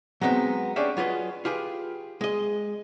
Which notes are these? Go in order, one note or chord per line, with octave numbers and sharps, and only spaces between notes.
F#3 G#3 B3 C4 D#4
C#4 D4 G4 G#4 C#5 E5
F#3 F4 G#4 B4 D#5
F4 G4 G#4 B4
G#3 D#5